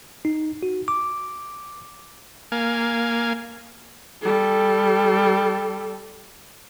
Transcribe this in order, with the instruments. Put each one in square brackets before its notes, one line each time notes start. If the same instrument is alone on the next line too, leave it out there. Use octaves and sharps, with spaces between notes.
[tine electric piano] D#4
F#4
D6
[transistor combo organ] A#3 F5 G#5
[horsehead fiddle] G3 A4